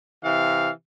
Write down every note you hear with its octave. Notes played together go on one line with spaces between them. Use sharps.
C3 E3 F5